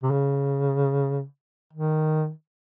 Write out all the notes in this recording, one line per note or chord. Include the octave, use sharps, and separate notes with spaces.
C3
C#3
D#3